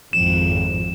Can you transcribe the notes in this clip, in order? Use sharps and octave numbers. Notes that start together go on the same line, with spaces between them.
G#1 F2 E7